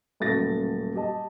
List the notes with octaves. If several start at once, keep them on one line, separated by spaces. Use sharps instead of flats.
D#1 A2 C#3 F#3 A6 A#6
G4 D#5 A5